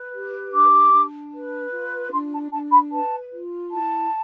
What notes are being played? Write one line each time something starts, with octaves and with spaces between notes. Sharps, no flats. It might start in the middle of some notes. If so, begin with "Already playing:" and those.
Already playing: B4
G4
D4 D6
D4
B4
F4
D4 C6
A5
D4 A5
B5
B4 A5
F4
E4 A5